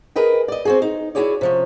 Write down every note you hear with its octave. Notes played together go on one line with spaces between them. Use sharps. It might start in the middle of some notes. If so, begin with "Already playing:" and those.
G#4 A#4 B4 D#5 G5
D5 D#5
C4 F#4 G#4
D#4
E4 F#4 G#4 C#5 D5
C3 F3 C#4